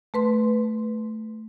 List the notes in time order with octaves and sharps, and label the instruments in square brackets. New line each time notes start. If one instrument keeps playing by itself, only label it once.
[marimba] A3 B4 C6